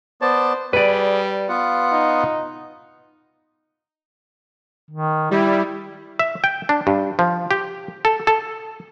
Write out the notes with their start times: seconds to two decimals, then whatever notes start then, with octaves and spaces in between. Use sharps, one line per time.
0.22 B3 C5 D5 A5
0.73 G3 G#4 B4 D5
1.48 B3 F4 F#5
1.92 D#4
4.91 D#3
5.31 G3 E4
6.19 E5
6.44 G5
6.69 D4
6.87 G2
7.19 F3
7.51 G4
8.05 A4
8.27 A4